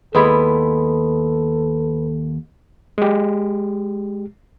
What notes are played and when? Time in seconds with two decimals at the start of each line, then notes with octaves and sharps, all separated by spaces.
0.15 D#2 G#3 B3 E4 A4 B4 B5
2.98 G#3 G4